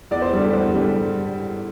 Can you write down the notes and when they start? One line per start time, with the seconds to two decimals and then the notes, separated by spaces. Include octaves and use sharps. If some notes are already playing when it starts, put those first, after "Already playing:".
0.11 E2 D5
0.22 C5
0.33 D3 G3
0.43 G4
0.53 E2 C5
0.75 D3 G3